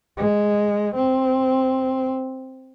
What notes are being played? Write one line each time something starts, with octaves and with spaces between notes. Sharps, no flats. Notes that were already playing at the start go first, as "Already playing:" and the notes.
G#3
C4